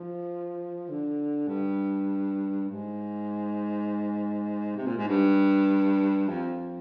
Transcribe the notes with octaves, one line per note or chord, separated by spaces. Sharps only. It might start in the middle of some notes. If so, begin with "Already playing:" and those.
Already playing: F3
D3
G2
G#2
C3
A#2
G#2
G2
F2